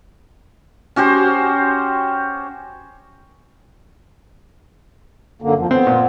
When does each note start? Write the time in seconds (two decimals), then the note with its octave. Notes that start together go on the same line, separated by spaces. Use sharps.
0.96 C#4 F#4 G4 C5
5.42 F#2 D3 A#3
5.58 F2 F3
5.71 B3 C4
5.87 A#2